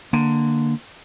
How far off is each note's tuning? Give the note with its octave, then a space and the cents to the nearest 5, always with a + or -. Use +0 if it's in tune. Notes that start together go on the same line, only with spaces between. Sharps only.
D3 +15 A#3 +0